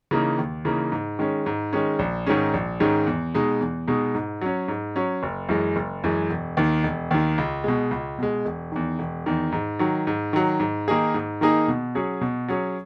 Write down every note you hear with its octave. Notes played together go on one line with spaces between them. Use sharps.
C#3 E3 A#3 D#4
D#2
C#3 E3 A#3 D#4
G#2
D#3 G#3 C#4
G#2
D#3 G#3 C#4
A#1
G#2 D#3 G#3 C#4
A#1
G#2 D#3 G#3 C#4
E2
B2 G#3 D#4
E2
B2 G#3 D#4
G#2
F#3 C#4
G#2
F#3 C#4
F#1
F#2 E3 G#3
F#1
F#2 E3 G#3
E1
D#2 D#3
E1
D#2 D#3
C#2
B2 G#3
C#2
B2 G#3
E1
E2 D#3
E1
E2 D#3
G#2
D#3 F#3
G#2
D#3 F#3
G#2
D#3 A#3 D#4 G#4
G#2
D#3 A#3 D#4 G#4
B2
F#3 C#4 G#4
B2
F#3 C#4 G#4